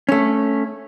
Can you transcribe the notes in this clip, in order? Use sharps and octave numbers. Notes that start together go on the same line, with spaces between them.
A3 C#4